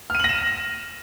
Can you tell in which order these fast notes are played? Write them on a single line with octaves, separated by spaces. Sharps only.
F6 D#7 F#7 A#6 E7